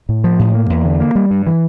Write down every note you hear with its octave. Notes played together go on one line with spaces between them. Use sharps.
A2
F3
A2
A#3
E2
D3
A#3
G3
G2
E3